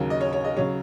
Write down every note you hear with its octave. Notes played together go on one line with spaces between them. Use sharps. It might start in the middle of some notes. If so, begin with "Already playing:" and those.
Already playing: D#2 C#3 F#3 A#4
D#5
C#5
C#5
D#5
C#3 F#3 C#5